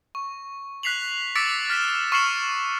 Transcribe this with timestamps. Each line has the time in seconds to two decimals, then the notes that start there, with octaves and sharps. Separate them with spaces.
0.15 C#6
0.83 F#6 B6 C7 F7 F#7
1.35 D6 E6 A6 B6 C#7 D7
1.70 F6 A6 B6 E7
2.12 C#6 F6 C7 C#7 E7 F#7